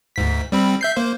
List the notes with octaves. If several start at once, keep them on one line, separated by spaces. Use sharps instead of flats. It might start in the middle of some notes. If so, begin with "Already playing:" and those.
D2 G#2 B6
G3 C4 B5
E5 G6 C7
A#3 C5